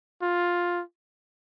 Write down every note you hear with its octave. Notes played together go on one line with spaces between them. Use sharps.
F4